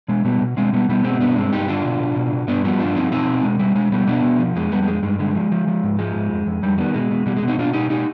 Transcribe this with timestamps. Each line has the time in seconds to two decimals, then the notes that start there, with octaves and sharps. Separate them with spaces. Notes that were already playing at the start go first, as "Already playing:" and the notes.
0.08 B2 G#3
0.25 B2 G3 B3
0.41 B2
0.57 B2 G#3 C4
0.73 B2 G3 B3
0.89 B2 G3 B3
1.04 B2 G#3 C4
1.20 G2 B3 D4
1.36 G2 G#3 C4
1.53 G2 D#4 G4
1.68 D3 D4 F4
1.85 B2
2.00 B2
2.16 B2
2.33 B2
2.48 G2 B3 D4
2.64 F3 G3 B3
2.80 G2 D4 F4
2.95 F3 C4 D#4
3.11 B2 C4 D#4
3.28 B2
3.43 B2 G#3
3.59 B2 G3
3.75 B2 G#3
3.92 B2 G3 B3
4.07 B2 B3 D4
4.23 B2
4.39 F3
4.56 F2 G#3
4.72 F2 G3 B3
4.83 B3
4.87 F2 G#3
5.03 G2 G#3
5.19 D3 G#3
5.35 F3
5.52 F3
5.68 F3
5.84 G#2
5.99 F3 G#3
6.15 G#2
6.31 F2
6.46 F2
6.63 F2 G3
6.78 D#3 G3 B3
6.94 B2 G#3
7.11 B2
7.26 B2 G3
7.37 G#3
7.42 B2
7.48 C4 D#4
7.58 B2 D4 F4
7.73 B2 D#4 G4
7.90 B2 D#4 G4